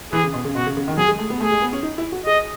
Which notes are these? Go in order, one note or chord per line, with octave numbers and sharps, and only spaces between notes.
E3 G#4
C#3
B2
C#3
B2 F#4
C#3
C#3
D#3
F#3 G#4
G#3
A3
B3
A3 G#4
G#3
B3
C#4
D#4
E4
F#4
G#4 D#5